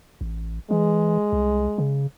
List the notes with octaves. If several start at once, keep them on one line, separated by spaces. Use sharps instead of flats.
A1
E3 G#3
C2
C#3